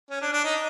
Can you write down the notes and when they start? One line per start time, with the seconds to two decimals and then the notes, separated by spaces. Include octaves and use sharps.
0.10 C#4
0.21 D4
0.33 D4
0.44 D#4